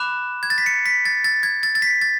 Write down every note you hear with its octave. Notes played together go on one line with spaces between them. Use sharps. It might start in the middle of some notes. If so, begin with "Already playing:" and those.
Already playing: B5 D6 F#6 E7
G#6
A6
B6
C#7
B6
A6
A6
G#6
A6
A6
B6
A6